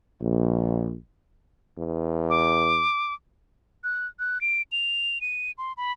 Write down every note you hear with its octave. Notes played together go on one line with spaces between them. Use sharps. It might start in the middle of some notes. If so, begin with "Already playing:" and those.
A#1
E2
D6
F#6
F#6
D7
F7
D#7
C6
B5